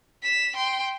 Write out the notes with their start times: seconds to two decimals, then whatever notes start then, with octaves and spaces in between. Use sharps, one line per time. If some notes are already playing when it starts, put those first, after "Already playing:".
0.23 B6 E7
0.56 G5 C6